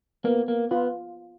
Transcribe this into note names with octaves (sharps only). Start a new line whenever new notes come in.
A#3 B3
A#3
B3 F4